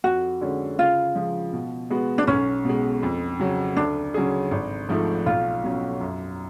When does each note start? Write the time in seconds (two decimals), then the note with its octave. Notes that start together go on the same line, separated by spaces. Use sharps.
0.04 F2 F#4
0.41 D3 G#3 C#4
0.79 C#3 F4
1.16 F3 G#3
1.53 B2
1.90 G#3 B3 F#4
2.18 D4
2.27 B1 C#4
2.65 B2 G#3
3.03 F2
3.39 C#3 F#3
3.77 D2 D4
4.14 C#3 F#3 C#4 G#4
4.51 G#1
4.89 G#2 F3 A3
5.26 B1 F4
5.64 B2 F#3 C#4
6.01 F#2